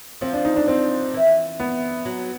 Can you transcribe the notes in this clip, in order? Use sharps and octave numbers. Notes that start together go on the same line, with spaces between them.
F3 C4
D4
D#4
D4
C4
E3
B3
F#3